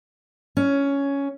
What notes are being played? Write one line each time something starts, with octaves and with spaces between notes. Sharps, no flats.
C#4